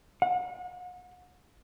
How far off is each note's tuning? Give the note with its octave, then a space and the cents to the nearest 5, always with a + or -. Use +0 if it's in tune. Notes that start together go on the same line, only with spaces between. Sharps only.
F#5 -40